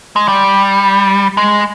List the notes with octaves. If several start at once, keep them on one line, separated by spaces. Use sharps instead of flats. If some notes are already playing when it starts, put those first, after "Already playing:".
G#3
G3
G#3